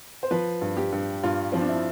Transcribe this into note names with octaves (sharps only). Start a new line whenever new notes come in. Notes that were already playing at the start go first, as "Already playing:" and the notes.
C5
F3 B4
G2
G4
G2
G2 F4
F3 C4
D4
E4